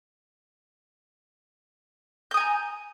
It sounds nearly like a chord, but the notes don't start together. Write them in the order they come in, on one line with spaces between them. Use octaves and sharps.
G6 D#6 G#5 A#5